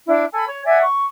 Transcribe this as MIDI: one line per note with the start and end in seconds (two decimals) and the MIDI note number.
0.07 0.24 62
0.07 0.24 64
0.33 0.43 69
0.33 0.43 80
0.33 0.43 83
0.47 0.64 73
0.65 0.81 74
0.65 0.81 76
0.65 0.81 78
0.65 0.81 80
0.82 1.05 85